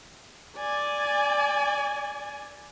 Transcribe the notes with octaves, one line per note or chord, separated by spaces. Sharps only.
D5 G#5